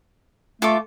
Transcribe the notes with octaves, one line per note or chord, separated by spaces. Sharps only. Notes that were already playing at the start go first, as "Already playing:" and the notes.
A3 F4 A4 D6